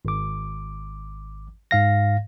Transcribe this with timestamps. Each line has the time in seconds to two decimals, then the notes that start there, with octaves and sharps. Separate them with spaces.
0.05 G#1 D6
1.71 G#2 F5 A#6